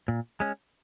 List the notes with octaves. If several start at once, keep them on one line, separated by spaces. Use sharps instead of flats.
A#2
G#3 C#4